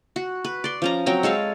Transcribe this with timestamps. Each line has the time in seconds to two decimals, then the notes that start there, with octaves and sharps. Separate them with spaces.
0.16 F#4
0.45 B4
0.64 D5 C6
0.82 F3 C#4 A#5
1.06 F#3 C4 G5 A#5
1.23 G#3 A4 C#5 F5